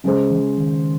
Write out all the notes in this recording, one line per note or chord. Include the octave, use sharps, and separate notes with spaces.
C#3 F#3 G#3 C#4 G#4 C5
E3
D#3